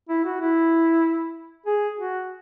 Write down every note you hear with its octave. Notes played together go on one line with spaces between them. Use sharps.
E4
F#4
E4
G#4
F#4